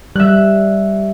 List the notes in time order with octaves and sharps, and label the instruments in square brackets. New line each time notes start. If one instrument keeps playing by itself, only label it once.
[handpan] G3 [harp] E5 F#6